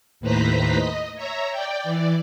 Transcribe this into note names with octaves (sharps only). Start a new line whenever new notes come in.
D#2 A2 B4 C5 A#5 B6
D#5
C#5 E5 A#5
D5 G5
E3 D5